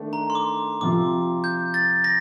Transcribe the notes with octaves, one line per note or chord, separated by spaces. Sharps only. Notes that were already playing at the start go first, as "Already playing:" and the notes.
Already playing: D#3 A3 D4
A#5
C6
D6
C3 F3 C4 F4 D6
G6
A6
A#6